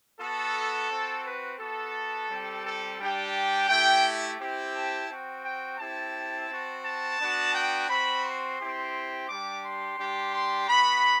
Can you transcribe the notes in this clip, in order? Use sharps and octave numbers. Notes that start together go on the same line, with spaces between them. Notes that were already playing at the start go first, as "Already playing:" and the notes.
B3 F#4 A4
C4 F#4
B4
B3 F#4 A4
G3 C4 G4
A4
G3 D4 G4 G5
A3 E4 G4 G5
C4 E4 G4
A5
C4 F#4 G5
G5
C4 E4 G4 A5
C4 F#4
A5
B3 D4 F#4
G5
C4 F#4 B5
C6
C4 E4 G4
G3 D4 G4 D6
C6
G3 D4 G4
C6
B3 F#4 B5